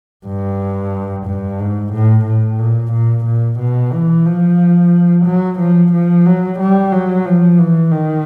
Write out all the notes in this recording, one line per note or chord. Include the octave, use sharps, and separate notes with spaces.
G2
G2
G#2
A2
A2
A#2
A#2
A#2
B2
E3
F3
F#3
F3
F3
F#3
G3
F#3
F3
E3
D#3